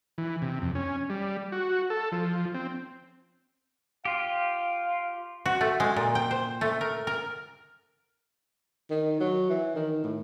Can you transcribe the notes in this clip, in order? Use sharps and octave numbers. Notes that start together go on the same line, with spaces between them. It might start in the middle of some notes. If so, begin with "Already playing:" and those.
E3
C3
F2
C#4
G3
F#4
A4
F3
C4
F4 G4 F5
F#4
A3
G#3
A#2
G5
C5
A3
A#4
A#4
D#3
F#3
E3
D#3
A2